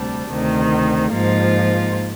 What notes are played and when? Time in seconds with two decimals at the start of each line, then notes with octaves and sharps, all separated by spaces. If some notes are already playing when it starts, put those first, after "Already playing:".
Already playing: D2 C3 G3 D4
0.32 D2 C3 D#3
1.13 G#2 F3 A#3 F4